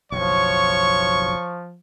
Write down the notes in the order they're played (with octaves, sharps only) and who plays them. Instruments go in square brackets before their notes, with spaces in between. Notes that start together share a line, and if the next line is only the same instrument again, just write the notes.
[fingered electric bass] F#1 B1 [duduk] F3 [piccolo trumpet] C#5 [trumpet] C#6